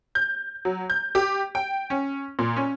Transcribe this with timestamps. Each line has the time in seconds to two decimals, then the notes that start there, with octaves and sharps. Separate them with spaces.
0.15 G6
0.65 F#3
0.90 G6
1.15 G4
1.55 G5
1.90 C#4
2.39 A#2
2.56 C#4